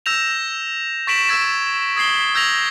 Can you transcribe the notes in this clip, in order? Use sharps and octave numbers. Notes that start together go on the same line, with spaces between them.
E6 G6 A#6 E7 F7
C#6 A6 B6 D7 E7 F#7
E6 G#6 A6
D#6 G#6 B6 C7 F#7 G7
E6 G6 G#6 A#6 F7 F#7